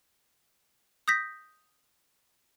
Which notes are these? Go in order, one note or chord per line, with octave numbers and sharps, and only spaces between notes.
D#6 G6 A#6 B6